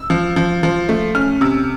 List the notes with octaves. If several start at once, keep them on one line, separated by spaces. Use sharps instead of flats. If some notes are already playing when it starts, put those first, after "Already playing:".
Already playing: E6
F3
F3
F3
A3
C#4 F6
C3 E6